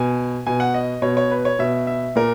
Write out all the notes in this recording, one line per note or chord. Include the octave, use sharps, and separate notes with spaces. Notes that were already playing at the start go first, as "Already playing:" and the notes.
Already playing: B2 G#5
B2 G#5
F#5
D#5
B2 C#5
C#5
B4
C#5
B2 E5
E5
A#2 A#4